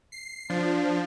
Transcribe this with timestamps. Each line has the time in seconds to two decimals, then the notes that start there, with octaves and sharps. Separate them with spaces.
0.12 C7
0.50 F3 D4